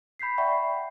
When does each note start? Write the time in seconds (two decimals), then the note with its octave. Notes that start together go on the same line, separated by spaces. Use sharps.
0.19 B5 G6 B6 C7
0.38 D5 E5 F#5 G5 B5 C#6